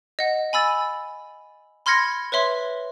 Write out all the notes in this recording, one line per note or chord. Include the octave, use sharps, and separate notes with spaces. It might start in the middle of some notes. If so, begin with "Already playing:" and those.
D#5 F#5
G#5 B5 E6 A6
B5 C6 F6 G#6 A#6 C#7
B4 C#5 E5 C6